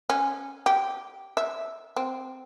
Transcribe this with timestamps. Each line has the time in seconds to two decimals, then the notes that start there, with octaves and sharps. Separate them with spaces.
0.10 C#4
0.66 G4
1.37 E5
1.97 C4